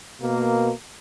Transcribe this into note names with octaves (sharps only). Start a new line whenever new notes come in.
B2 A#3